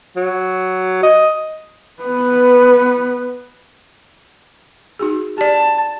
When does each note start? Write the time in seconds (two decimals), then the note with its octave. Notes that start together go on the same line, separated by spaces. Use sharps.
0.16 F#3
1.03 D#5
2.02 B3 B4
4.99 D#4 F#4 G#4
5.38 G4 D5 A5